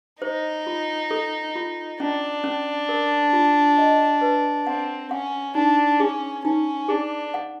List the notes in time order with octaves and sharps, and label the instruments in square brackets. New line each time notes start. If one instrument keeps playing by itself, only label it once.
[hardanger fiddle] D#4 [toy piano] C5
[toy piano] F4
A4
F4
[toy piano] C#4 [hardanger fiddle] D4
[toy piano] C#4
A#4
F4
D#5
B4
[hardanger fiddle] C4 [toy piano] F#5
[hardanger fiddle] C#4 [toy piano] F#5
[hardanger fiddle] D4 [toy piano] D#4
[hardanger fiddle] C#4 [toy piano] G#4
[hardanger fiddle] C#4 [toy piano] D#4
[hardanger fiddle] D4 [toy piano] G#4
[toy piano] F#5